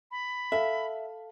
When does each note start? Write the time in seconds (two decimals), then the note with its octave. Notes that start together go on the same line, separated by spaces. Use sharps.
0.11 B5
0.52 A4 E5 F5